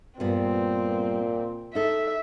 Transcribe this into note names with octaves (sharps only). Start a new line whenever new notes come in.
G2 A#2 G3 B3 C4
D#4 A4 E5